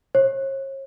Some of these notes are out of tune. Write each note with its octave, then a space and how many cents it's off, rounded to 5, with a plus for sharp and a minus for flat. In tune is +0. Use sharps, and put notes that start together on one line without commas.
C#5 -40